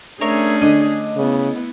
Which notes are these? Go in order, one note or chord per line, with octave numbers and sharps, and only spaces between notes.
A3 C#4 D4 G#4 A#4 C#5 E5
D3 D#5
C#3 B3 E4